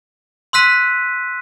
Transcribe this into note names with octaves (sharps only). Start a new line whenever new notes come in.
C6 E6 F#6 B6 D#7